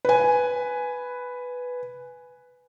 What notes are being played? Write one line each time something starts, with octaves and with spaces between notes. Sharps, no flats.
B4 G#5